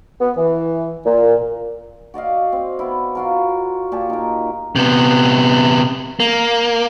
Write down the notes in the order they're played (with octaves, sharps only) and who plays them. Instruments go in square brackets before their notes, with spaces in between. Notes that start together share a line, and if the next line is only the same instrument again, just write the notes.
[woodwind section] B3
E3
A#2
[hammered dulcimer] F#4 D5 D#5 F5
C4
B3 E4
F4 F#4 A#4
A#2 G4 C#5 A5
D#4 A#4
[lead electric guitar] C3 B3
A#3